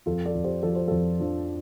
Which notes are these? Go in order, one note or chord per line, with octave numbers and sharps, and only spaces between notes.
F2 F4 A4
A4 D5
F2
G4 C5
F3 A4
C5
F2 F4 A4
F3 D4